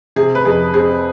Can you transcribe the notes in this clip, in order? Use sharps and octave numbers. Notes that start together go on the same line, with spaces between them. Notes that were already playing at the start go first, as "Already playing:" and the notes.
C3 G#4
B4
F2 G#4
C4 G#4